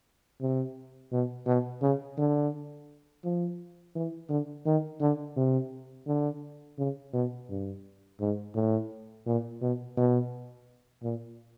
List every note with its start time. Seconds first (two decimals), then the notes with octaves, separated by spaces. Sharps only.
0.41 C3
1.12 B2
1.47 B2
1.82 C#3
2.18 D3
3.24 F3
3.95 E3
4.30 D3
4.66 D#3
5.01 D3
5.36 C3
6.07 D3
6.78 C#3
7.13 B2
7.50 G2
8.20 G#2
8.55 A2
9.26 A#2
9.62 B2
9.97 B2
11.03 A#2